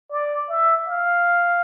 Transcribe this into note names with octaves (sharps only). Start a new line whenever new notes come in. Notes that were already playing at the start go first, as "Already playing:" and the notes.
D5
E5
F5